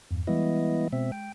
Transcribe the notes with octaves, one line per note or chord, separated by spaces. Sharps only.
E2 G2
E3 G3 G#3 B3 E4 D#5
B2 G#3 C4 E5
G5